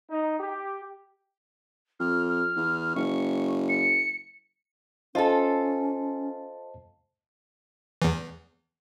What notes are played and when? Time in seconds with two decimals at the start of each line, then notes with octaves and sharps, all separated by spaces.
0.10 D#4
0.40 G4
2.00 F2 F6
2.29 F6
2.56 E2
2.95 F#1 C#6
3.69 C#7
5.15 C#4 F4 A4 C5 D#5 A5
8.02 E2 E3